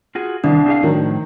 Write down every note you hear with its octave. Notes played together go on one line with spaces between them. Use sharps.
F4 F#4 G#4
C2 D#3 D4
C4 G#4 F5
A2 D#3 F3 F#3